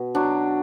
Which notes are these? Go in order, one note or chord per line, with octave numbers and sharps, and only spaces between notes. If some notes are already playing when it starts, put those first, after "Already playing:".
Already playing: B2
F#3 D4